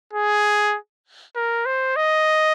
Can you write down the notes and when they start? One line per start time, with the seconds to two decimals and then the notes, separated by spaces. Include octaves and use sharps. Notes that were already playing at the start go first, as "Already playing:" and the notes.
0.13 G#4
1.35 A#4
1.65 C5
1.96 D#5